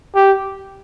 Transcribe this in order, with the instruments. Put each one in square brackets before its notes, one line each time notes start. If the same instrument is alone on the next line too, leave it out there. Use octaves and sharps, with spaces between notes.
[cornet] G4